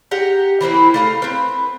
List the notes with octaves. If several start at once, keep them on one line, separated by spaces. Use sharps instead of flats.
G4 F#5 A#5
E3 A#3 C4 E4
A3 F5 A#5
C4 B4